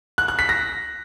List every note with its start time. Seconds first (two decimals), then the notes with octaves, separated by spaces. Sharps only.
0.18 F#6
0.28 F#6
0.39 B6
0.49 A#6